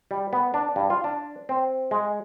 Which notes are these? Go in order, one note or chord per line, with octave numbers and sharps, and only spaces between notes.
G3
B3
D4
G2
F4
D4
C4
G#3